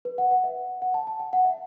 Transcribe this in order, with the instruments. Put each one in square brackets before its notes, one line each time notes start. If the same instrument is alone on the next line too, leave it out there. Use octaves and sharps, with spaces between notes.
[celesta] B4
F#5
F#5
E5
F#5
A5
A5
G5
F#5
E5